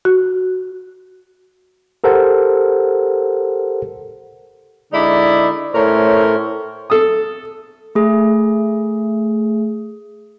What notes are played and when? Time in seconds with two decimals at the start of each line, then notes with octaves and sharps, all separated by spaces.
0.05 F#4
2.04 G4 A4 A#4 C5 F#5
4.93 D3 G#3 D#4 E4 D5
5.74 A2 A3 C#4 A#4 C5 C#5
6.90 A4 D#6
7.95 A3 G#4